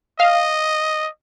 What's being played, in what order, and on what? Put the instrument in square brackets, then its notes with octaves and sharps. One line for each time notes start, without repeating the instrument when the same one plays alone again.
[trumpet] D#5 [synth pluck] F5